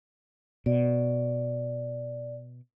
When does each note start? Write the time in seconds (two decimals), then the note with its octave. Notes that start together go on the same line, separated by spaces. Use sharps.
0.66 B2 D5